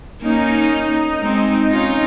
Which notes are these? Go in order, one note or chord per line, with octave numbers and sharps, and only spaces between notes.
A#3 C#4 D#4
G#3 C4
C#4 F4